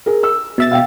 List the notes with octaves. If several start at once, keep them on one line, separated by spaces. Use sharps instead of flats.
G#4 A#4
E6
B2 E5 A6
F5 G5